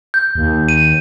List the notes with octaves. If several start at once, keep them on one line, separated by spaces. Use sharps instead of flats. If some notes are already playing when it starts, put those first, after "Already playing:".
G6
D#2
D#7